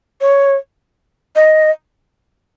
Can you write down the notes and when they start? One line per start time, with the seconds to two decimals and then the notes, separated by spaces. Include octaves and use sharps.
0.21 C#5
1.36 D#5